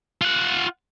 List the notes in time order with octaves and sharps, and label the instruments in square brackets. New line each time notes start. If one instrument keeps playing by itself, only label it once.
[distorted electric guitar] F4 F#5